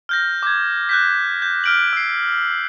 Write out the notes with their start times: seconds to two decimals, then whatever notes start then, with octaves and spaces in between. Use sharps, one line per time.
0.09 F6 G6 A#6
0.43 D6 G6 G#6
0.89 F#6 G6 B6
1.42 G6
1.64 F6 D7 F#7
1.93 E6 C7